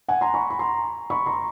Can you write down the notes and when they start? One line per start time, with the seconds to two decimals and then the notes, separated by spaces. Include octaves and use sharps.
0.08 F#5 G#5
0.21 A#5 C6
0.34 B5 C#6
0.50 B5
0.59 A#5 C6
1.10 B5 C#6
1.26 A#5 C6